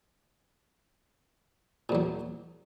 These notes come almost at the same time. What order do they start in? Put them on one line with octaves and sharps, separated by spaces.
A#2 E2 F#3